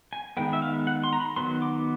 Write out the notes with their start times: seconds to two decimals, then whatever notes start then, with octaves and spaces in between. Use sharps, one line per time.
0.13 G#5
0.37 D#3 G#3 B3 G5
0.53 E5
0.62 F5
0.87 F#5
1.04 C6
1.13 A#5
1.20 B5
1.36 D#3 F#3 B3 C6
1.62 D6